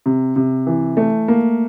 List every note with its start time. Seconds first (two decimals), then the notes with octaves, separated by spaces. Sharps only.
0.06 C3
0.36 C3
0.67 E3
0.97 A3
1.28 A#3